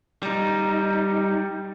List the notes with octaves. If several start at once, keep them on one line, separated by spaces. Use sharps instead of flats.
G3 D#4